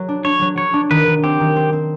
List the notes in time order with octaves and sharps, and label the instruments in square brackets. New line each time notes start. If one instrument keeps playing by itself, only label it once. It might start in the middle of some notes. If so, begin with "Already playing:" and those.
Already playing: [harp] F#3
D4
[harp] D4 [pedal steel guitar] C#5
[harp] F#3
[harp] F#3 [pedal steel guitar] C#5
[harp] D4
[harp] D#3 [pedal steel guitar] B4
[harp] D#3
[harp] C4 [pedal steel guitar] G4
[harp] D#3
C4
C4